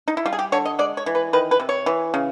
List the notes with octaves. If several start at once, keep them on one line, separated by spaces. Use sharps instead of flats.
D#4
E4
G3 F4
G#4
G4
D3 C#5
D#5
G#3 D5
C#5
E3
B4
D#3 B4
B4
C3
C#5
E3
C#3